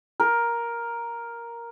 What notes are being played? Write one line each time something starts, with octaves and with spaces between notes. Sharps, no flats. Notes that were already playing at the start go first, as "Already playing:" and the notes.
A#4